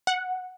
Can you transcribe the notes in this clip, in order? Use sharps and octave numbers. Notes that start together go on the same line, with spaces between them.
F#5